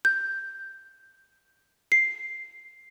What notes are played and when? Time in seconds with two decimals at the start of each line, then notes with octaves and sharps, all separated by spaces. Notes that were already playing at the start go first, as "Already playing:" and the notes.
0.05 G6
1.92 C7